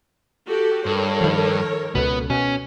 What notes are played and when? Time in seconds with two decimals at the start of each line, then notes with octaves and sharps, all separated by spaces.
0.47 F#4 G4 A4
0.86 G2 A4 A#4 C#5
1.21 D#3 F3
1.95 C#2 B2 B3
2.30 B2 C#4